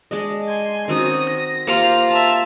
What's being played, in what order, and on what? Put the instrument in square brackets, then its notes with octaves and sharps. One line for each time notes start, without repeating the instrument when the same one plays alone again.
[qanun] G#3 D4 D#5
[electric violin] G#5 C6
[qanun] D#3 C4 F#4 [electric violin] C#4 D#6
[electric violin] A#6
[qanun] A#3 G4 C5 [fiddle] F4 F6
[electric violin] E5 A5 [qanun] A#5